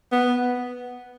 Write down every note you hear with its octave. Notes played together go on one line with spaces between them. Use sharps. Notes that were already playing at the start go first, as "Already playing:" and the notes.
B3